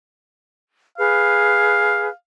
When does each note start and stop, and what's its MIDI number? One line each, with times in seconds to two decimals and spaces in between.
0.98 2.07 68
0.98 2.07 71
0.98 2.12 77